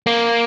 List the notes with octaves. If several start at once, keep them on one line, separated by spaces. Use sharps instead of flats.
A#3